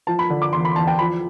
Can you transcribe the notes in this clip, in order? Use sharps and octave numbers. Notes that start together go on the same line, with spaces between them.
F3 A5
B5
D3
D6
E2 C6
B5
E2 A5
G5
F3 B5